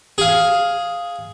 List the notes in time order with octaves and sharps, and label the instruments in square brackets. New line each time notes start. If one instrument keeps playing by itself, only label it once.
[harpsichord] G#4 F5